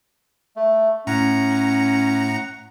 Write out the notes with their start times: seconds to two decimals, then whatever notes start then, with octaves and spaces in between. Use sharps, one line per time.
0.56 A3
1.07 A2 C#4 F#5 A#5